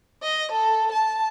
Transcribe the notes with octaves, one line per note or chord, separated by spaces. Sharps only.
D#5
A4
A5